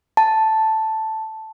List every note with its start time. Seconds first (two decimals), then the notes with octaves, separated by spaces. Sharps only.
0.17 A5